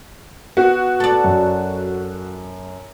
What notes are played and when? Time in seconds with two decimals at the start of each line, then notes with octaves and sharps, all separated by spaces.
0.57 B3 F#4
1.00 A4 D5
1.24 F#2